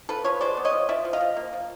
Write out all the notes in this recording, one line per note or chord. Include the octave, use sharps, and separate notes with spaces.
F3 A4 B4
F3 B4 C#5
G#3 C5 D5
B3
C#5 D#5
F3
F3 D5 E5
F3
D#5 F5
F3
A#3
F3